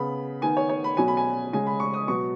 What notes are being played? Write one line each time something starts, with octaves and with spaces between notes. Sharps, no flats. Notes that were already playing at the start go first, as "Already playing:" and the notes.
Already playing: C#3 B3 B5
D#3 B3 G#5
C#5
C#5
B5
B2 F#3 C#4 G#5
B5
G#5
C#3 G#3 C#4 G#5
B5
C#6
D#6
B2 F#3 B3 C#6